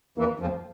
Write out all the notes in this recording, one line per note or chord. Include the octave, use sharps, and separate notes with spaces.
E2 E3 A#3
F2 F3